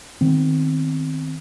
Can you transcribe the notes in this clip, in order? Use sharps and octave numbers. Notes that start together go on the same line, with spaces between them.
D#3 B3 C4